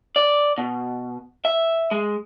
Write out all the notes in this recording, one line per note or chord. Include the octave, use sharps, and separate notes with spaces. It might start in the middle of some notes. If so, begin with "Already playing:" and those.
D5
B2
E5
G#3